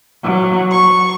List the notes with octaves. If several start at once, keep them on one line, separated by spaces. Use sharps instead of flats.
F#3
C#6